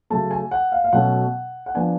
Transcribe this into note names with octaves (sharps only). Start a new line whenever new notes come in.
C#3 F#3 A3 A5
G#5
F#5
F5
F5
B2 F#3 A3 C#4 F#5
F#5
F3 B3 D4 G#5